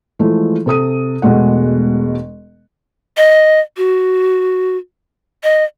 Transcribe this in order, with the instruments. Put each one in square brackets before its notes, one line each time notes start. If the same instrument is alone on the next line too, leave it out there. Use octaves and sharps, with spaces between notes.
[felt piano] E3 F3 G#3 A3
C3 A4 D#6 D#7
E1 B2 G#3 A3 F#5
[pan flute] D#5
F#4
D#5